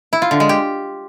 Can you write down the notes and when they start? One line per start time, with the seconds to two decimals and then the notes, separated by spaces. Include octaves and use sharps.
0.13 E4
0.22 F4
0.31 D3
0.40 G#3
0.49 G4